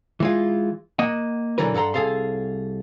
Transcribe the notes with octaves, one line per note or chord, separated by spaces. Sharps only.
E3 G#3 F4
A#3 D#5 F#5
B1 D3 E3 F#3 A#4 B4
G2 A4 F#5 A#5 C6
C2 G#4 A4 F5 C6